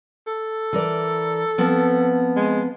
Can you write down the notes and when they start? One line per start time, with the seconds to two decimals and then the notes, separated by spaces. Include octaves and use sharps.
0.27 A4
0.73 E3 A#4 D5
1.58 F3 B3 C4
2.36 G#3